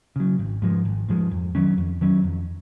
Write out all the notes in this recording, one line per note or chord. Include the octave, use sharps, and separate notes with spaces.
C#3 F#3
G#1
G#2 F3 G#3
G#1
G#2 F3 G#3
F2
D#3 F#3 C#4
F2
D#3 F#3 C#4
F2